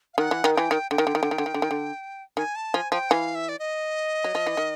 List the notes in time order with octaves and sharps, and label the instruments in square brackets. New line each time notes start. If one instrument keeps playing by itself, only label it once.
[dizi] F5
[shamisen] D#3 [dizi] F#5
[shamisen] E3
D#3
[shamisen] E3 [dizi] G5
[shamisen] D#3
[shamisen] D3 [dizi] G5
[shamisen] D#3
D3
D#3
D3
D#3
D3
D#3
D3
D#3
D3
[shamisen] D#3 [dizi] G#5
[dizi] A5
[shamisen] F3 [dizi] G#5
[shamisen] F3 [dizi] G5
[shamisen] E3 [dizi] F5
[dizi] E5
D5
D#5
[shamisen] F#3
F3
E3
D#3